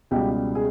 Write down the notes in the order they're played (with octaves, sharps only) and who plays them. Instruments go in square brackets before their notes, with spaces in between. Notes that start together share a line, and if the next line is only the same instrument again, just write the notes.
[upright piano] C#2 B2 G3 G4
G#4